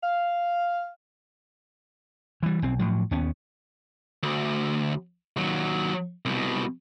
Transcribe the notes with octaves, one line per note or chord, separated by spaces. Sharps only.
F5
E3 G3
B1 C4
A2 F3 F#3
D#2 B3 C#4
D2
D#2 F#3
C2 B2